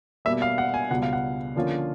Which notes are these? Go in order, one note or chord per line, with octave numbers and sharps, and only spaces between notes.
B2 G3 A#3 E5
F5
F#5
G#5
C#2 B2 G3 F#5
F5
F#5
D3 F3 A#3 C#4 F4